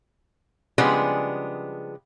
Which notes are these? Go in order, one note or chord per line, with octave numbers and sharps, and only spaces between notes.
C#3 F3 G3 G#3 B3 D4